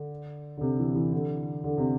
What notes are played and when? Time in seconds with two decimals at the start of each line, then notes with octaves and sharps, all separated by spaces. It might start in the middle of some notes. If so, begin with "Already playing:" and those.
Already playing: D3
0.57 D3
0.61 C3
0.79 E3
0.95 E3
1.12 D3
1.64 D3
1.78 C3